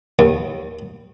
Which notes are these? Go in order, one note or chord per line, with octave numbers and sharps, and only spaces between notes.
D#2